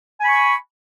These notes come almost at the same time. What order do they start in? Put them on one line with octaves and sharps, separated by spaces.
G#5 B5 C#6